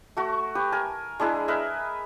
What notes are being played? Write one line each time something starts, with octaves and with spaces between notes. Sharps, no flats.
A3 F#4
G4 B4
A#4 G#5
G#3 D4 E4 G#4
A#4 B4 D#5 E5